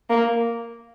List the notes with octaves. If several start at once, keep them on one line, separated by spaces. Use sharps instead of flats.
A#3